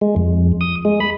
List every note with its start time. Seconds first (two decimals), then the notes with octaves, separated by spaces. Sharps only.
0.01 G#3
0.16 F2
0.61 D#6
0.85 G#3
1.00 B5